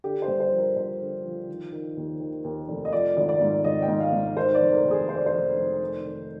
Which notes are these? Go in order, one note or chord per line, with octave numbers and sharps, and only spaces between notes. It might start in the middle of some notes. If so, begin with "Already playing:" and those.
D3 G4
C5
G2
C5
F3
A#4
G2 C5
D3
F3
D#3
D#3
D#2
D#3
D#2
F1
D#5
F3 D5
G#1
D5
G#2
G#1 D#5
G5
G#2
F5
G#2
D#3 C5
D5
F1
A#4
D#2
G#4
D#2 C5
D5
C5
F1
F1
D#3
D#3